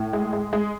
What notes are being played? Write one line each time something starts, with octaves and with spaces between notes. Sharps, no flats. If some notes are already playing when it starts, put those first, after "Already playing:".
Already playing: A2
G#3
G#3
G#3